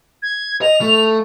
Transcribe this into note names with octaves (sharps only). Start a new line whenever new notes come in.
G#6
D#5 F7
A3